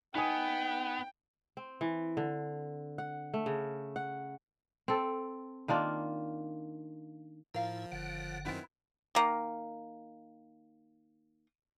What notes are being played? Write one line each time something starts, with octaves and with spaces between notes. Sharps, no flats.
B3 D#4 G5 G#5 D#6
C4
E3
D3
F#5
A3
C#3
F#5
C4 A4
D#3 A#3 D4 F4
A2 F3 E4 A#4 F5
F#1 D3 F#5
F#2 D#3 B3 C4 E4
D#3 A#3